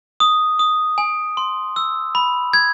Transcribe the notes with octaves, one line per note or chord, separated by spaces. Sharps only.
D#6
D#6
G#5
C6
E6
B5
G#6